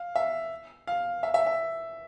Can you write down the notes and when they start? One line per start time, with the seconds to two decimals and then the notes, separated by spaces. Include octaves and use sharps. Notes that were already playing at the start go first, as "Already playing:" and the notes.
Already playing: F5
0.16 E5
0.87 F5
1.23 E5
1.34 E5
1.47 E5